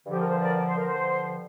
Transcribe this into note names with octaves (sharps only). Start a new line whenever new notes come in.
G2 D3 F3 G4
A#4
C5
A#4 D5
D5
C5
G2 D3 F3 A#4
C5